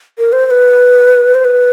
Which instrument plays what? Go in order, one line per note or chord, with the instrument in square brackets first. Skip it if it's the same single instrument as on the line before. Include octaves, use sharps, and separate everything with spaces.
[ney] A#4
C5
C5
B4
C5
B4